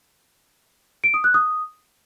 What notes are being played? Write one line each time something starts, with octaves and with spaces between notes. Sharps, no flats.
D7
D#6
F#6
D#6